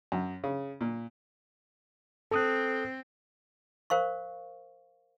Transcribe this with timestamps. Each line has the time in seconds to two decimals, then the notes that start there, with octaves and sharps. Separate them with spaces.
0.12 F#2
0.44 C#3
0.81 A#2
2.31 C4 A4 D#6 F#6
3.90 A#4 C5 F5 C#6